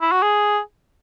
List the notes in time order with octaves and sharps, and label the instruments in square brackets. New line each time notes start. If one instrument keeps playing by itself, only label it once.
[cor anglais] E4
F#4
G#4